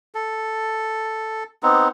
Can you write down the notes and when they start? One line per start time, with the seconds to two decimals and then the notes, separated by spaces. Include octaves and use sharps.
0.15 A4
1.63 B3 C4 D#4